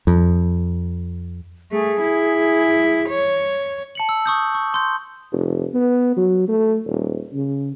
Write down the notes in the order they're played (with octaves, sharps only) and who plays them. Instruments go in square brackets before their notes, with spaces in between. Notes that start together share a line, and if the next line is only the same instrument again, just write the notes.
[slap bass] F2
[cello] A3 [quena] G#4
[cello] E4
C#5
[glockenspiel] A5 C#7 F#7
E6
C#6 D#6 G6
C#6
C6 G6
[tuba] F1
B3
F#3
A3
D#1
C#3